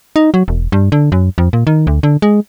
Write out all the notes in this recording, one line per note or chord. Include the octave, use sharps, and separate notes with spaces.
D#4
F#3
E1
G2
D3
F#2
F2
A#2
D#3
D2
D3
G#3